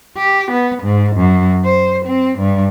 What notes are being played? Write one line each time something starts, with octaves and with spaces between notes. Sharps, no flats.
G4
B3
G#2
F#2
C5
C4
G2